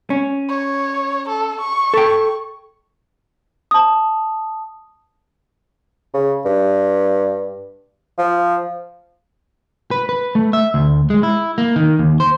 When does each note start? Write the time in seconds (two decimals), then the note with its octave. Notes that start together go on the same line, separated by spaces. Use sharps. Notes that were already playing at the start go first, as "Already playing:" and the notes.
0.10 C#4
0.49 C#5
1.29 A4
1.61 C#6
1.94 A4 G5
3.71 A5 D#6
6.14 C#3
6.45 G2
8.18 F3
9.91 B4
10.09 B4
10.35 A3
10.53 E5
10.74 D2
11.10 G#3
11.23 E4
11.58 A#3
11.76 D#3
11.99 D#2
12.20 C5